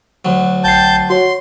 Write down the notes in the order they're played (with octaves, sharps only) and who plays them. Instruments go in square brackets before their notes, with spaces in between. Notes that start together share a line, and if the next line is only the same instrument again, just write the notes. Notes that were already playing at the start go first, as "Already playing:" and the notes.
[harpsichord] D2 F#3
[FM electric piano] A#1 G5 C7 [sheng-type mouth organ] A5 G6
[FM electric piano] F#4 C#5 [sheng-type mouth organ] C6